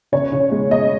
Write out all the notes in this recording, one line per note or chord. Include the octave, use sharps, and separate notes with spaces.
C#3 C#5
C#3
G#3
G#3 D#5